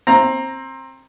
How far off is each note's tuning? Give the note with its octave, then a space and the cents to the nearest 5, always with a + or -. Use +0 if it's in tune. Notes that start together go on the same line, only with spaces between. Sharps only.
C4 +20 A#5 +0